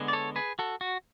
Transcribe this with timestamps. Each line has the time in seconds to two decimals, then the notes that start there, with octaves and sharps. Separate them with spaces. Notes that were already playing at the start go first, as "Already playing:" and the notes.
Already playing: D3 G#3 B3
0.08 D5
0.13 A4 C#5
0.36 G#4 B4
0.59 F#4 A4
0.81 F#4